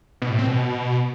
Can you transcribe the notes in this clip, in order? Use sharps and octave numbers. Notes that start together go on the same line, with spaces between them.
B2
A2
C4
B2